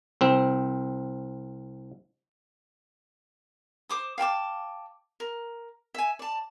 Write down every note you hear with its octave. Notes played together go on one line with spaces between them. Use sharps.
C2 C4
C5 D6 D#6
F5 G5 A5 D6
A#4
E5 G#5
D5 A5